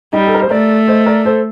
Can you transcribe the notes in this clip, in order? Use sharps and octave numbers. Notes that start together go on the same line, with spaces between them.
G3 D#4 G4
A4
A#4
C5
A3 A#4 D5
C5 D#5
A#4 D5
A4 C5